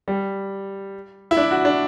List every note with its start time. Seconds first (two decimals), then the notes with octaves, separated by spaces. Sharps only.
0.08 G3
1.31 E4
1.37 D4
1.51 F#4
1.65 D4